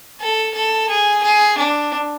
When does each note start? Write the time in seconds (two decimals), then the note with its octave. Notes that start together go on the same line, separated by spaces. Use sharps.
0.21 A4
0.55 A4
0.90 G#4
1.24 G#4
1.59 D4